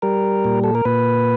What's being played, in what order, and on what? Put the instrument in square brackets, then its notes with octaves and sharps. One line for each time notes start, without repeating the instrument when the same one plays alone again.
[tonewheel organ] G3 A#4
A#2
A4
A#4
A#2 B4